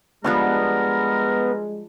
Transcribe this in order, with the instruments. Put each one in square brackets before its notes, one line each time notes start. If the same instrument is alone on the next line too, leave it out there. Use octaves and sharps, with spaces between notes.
[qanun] F3 G3 D4 [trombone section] G#3 [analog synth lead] B3 [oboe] A#4